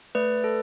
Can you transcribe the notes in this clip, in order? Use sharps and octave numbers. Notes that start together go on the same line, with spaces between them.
A3 B4 D5
A4